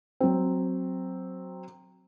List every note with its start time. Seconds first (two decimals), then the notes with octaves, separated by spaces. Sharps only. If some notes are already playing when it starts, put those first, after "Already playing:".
0.20 F#3 C4